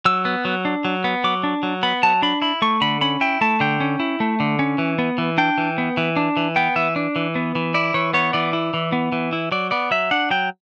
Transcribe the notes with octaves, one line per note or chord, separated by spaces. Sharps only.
F#3 E6
B3
F#3
D4
F#3
B3
F#3 D6
D4
F#3
B3 B5
F#3 A5
D4 B5
E4 B5
A3 C#6
D3 B5
C#4 B5
E4 G5
A3 A5
D3 G5
C#4
E4
A3
D3
C#4
E3
B3
E3
D4 G5
E3
B3
E3
D4
E3
B3 G5
E3 E5
D4
E3
B3
E3
E4 D5
E3 C#5
B3 C#5
E3 D5
E4
E3
B3
E3
E4
F#3 D5
B3 D5
F#3 E5
D4 F#5
F#3 G5